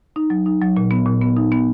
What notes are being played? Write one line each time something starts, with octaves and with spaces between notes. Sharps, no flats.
D#4
F#3
D#4
F#3
A#2
B3
A#2
B3
D#4
B3